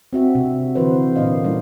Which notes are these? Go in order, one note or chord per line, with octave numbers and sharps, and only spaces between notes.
C4 F#4 E5
C3 D4
D3 E3 F#4 B4 C5
A#2 D3 A#3 D4 D#5 F5
G3 C#4 E4 F4